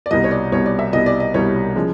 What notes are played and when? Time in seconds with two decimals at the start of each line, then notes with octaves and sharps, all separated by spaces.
0.06 D5
0.11 C2 B2 G3 D#5
0.24 C#5
0.31 D5
0.52 C2 B2 G3 C#5
0.66 D5
0.79 E5
0.93 C2 B2 G3 D#5
1.06 D5
1.20 D#5
1.34 C2 B2 G3 C#5
1.76 C#3 F3 G#3